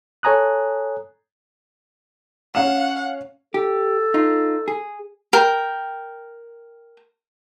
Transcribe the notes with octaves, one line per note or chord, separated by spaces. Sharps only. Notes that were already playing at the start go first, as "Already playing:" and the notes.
A4 C#5 G#5 A#5 D#6 F#6
C#4 F5 F#5 E7
G4 A4
D#4 F4
G#4
A#4 G5